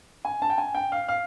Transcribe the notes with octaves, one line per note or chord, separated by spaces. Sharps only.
G#5
A5
G5
G#5
G5
F5
F5